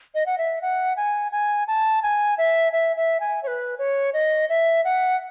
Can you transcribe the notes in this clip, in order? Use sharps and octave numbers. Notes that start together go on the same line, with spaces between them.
D#5
F#5
E5
F#5
G#5
G#5
A5
G#5
E5
E5
E5
G#5
C#5
B4
C#5
D#5
E5
F#5